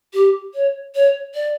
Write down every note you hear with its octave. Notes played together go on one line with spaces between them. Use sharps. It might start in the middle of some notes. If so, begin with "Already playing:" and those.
G4
C#5
C#5
D5